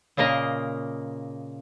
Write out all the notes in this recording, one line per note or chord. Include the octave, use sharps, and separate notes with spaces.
A#2 C#3 A#3 A#4 D#5